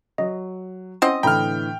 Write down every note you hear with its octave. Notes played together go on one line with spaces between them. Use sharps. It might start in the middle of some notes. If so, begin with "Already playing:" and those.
F#3 D#5
C4 C#4 E4 D#5 F#5
A2 D3 E3 G5 A#5 B5 F6